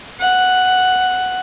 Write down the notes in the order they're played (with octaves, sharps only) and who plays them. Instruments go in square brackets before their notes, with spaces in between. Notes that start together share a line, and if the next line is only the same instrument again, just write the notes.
[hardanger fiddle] F#5